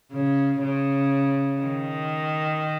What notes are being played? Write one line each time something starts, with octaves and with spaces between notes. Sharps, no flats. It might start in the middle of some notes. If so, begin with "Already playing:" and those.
C#3
C#3
D#3